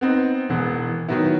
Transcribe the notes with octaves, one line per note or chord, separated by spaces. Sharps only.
B3 C4 D#4
E1 E3 G#3 B3
D#3 F#3 B3 E4